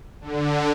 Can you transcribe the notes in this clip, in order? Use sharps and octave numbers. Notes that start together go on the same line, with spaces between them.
D3